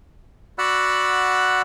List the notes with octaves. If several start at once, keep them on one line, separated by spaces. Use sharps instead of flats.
F#4 D5 F#5 B5 E6 F#6